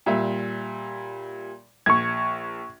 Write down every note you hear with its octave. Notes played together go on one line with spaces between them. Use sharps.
A#2 G3 E5
A#1 C#6 G#6